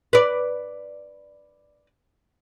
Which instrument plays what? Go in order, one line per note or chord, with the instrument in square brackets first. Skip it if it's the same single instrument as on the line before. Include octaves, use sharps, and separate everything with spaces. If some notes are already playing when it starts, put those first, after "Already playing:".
[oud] B4 D5